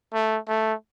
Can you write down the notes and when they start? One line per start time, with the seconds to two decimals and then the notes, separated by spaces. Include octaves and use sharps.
0.13 A3
0.48 A3